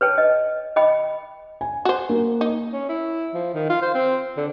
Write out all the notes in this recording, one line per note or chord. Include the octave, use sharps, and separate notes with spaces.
B4 C#5 G5 A5
D#5
D#5 G5 B5
G#5
F#4 C5
A#3
D#4
C#4
E4
F3
D#3
F4
C5
C4
D3